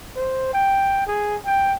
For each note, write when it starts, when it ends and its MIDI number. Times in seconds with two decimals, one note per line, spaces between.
0.16 0.51 72
0.53 1.05 79
1.07 1.36 68
1.46 1.75 79